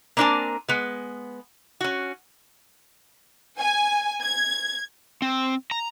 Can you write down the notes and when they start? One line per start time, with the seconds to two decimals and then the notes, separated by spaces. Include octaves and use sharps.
0.17 A#3 C4 D4 A#4 G#5 A5
0.68 G#3 B3
1.81 C#4 F#4
3.59 G#5
4.21 G#6
5.22 C4
5.71 A#5